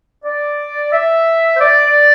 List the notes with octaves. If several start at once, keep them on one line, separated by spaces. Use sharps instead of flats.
D5
E5
C5
D5